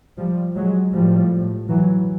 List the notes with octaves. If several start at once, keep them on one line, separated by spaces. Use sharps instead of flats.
F3 G3
F#3 G#3
A2 F3 G3
E3 F#3